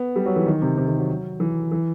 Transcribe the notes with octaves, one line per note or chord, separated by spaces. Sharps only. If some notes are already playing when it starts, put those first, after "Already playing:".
Already playing: B3
G3
F#3
E3
D#3
C3
C3
D#3
F#3
E3
E3